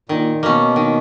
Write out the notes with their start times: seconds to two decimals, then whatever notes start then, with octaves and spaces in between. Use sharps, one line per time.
0.09 A#2 D#3
0.42 B2 A#3 C#4
0.76 D#3